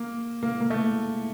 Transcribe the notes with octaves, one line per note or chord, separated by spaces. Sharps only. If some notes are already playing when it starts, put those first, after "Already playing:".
Already playing: A#3
A#3
A#3
A3